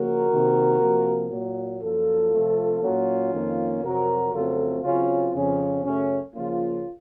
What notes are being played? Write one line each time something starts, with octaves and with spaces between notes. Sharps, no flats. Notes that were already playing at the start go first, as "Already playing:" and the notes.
Already playing: C#3 F3 A#3 F#4 A#4
C3 D#3 A#3
C3 F3 A#3
A#2 F#3 A#3
F#2 F3 A#3 F4 A4
C3 F3 A3 C4
A#2 F#3 A#3 C#4 F4
F2 D#3 A#3
F2 C3 F#3 F#4 A#4
F2 C#3 F#3 A3 C4 F4 A4
C#3 F#3 C4 C#4 F4
F2 C#3 F3 C4 C#4
F#2 C#3 A3 C#4
C#3 F3 A#3 C#4 F4